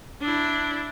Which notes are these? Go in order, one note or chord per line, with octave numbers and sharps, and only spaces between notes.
D4 E4